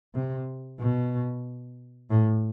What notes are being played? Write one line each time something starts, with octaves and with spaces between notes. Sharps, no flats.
C3
B2
A2